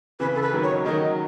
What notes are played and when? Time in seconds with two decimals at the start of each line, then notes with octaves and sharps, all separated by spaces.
0.20 C#3 E3 B4
0.35 A4
0.42 B4
0.53 D#3 F#3
0.63 C#5
0.85 D#3 F#3 D#5